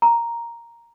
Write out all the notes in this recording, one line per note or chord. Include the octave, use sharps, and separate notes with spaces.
A#5